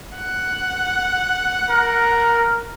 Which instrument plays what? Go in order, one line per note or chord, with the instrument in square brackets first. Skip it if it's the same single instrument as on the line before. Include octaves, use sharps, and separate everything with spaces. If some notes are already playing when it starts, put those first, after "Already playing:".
[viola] F#5
[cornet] A#4